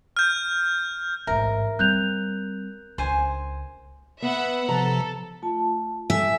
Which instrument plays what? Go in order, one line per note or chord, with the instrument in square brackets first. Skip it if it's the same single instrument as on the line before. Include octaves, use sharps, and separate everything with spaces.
[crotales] F6 G6
[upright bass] A1 G#2 [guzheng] A#4 [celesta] E5
[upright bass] G3 C4 [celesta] F#6 G6 F7
[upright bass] C#2 [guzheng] C5 G#5
[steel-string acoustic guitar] B3 [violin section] E5 F#5 B5
[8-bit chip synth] C3 F3 [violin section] A4 [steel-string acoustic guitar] A#5
[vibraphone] A3 F4 A5
[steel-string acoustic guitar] E5 [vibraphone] G#5